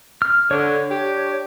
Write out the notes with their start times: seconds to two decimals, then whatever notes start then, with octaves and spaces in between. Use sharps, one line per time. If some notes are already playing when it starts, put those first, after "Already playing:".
0.22 F6
0.51 D3 C#5
0.89 D4 G4